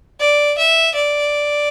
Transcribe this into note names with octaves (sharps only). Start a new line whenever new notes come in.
D5
E5
D5